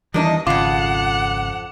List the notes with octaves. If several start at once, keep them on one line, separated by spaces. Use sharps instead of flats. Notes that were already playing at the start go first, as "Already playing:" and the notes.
E2 D#3 E3 G3 D4 D#4 D#5
G#1 F2 C#3 F4 F#5 D6